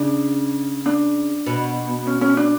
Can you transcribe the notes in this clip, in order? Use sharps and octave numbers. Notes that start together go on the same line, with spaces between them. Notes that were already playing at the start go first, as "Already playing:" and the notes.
Already playing: C#3 D4
D4
B2
C#4
C#4
D4